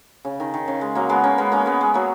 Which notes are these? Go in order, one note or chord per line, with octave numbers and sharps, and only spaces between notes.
C#3
D#3
D#3
C#3
G#3
F#3 A#3
G#3 B3
A#3 C#4
G#3 B3
A#3 C#4
G#3 B3
G#3
F#3 A#3